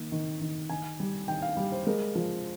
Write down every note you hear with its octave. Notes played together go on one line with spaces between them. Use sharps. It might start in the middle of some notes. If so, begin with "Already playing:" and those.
Already playing: D#3 A#3
D#3
D#3
D#3 G#5
G3
D#3 G5
F5
G3
C5
G#3 A#4
F3